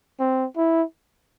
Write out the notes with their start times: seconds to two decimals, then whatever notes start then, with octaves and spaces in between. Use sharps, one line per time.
0.20 C4
0.57 E4